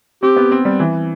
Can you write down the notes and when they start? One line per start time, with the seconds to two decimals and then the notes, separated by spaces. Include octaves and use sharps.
0.23 C4 G4
0.37 B3
0.52 C4
0.65 G3
0.80 E3